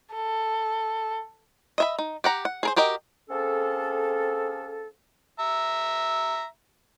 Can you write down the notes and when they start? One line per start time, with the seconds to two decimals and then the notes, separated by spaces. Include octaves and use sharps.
0.14 A4
1.78 D#5 E5 B5
1.99 D#4
2.24 G4 F#5 A#5
2.45 F#5
2.63 G#4 A#4 C5
2.76 F#4 G4 A#4 D#5
3.30 A#3 C4 C#4 G#4 A4
5.39 E5 A#5